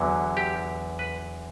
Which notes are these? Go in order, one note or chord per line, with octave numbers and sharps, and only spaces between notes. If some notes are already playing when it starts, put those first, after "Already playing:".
Already playing: E2 D3 F#3
G4
B4